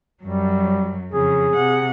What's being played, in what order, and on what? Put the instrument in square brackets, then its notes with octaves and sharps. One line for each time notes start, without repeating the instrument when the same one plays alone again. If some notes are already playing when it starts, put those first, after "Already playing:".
[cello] F#2 F#3 [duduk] G3
[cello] F2 C#3 [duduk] G#4
[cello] C3 F#5